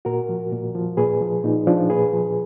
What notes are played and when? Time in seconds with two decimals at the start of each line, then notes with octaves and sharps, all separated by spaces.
0.05 A#2 F#4 A#4
0.29 F3
0.52 A#2
0.75 F3
0.97 A#2 G#4 B4
1.21 F3
1.44 A#2 D#4
1.67 F3 D4
1.90 A#2 G#4 B4
2.13 F3